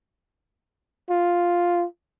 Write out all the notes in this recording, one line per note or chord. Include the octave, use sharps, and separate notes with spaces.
F4